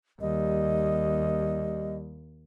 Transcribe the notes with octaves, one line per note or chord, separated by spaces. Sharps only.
D#2 G3 D#5